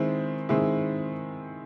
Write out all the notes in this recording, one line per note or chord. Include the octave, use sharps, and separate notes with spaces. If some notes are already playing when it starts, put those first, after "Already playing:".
Already playing: D#3 G#3 C4 E4
D#3 G#3 C4 E4